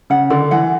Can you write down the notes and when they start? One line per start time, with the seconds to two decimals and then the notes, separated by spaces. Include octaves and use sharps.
0.10 C#3 F#5
0.30 D3 D5
0.51 E3 F#5